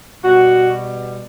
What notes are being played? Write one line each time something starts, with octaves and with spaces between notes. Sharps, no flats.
B2 G3 B3 F#4